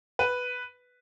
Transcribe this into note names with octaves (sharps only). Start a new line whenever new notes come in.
B4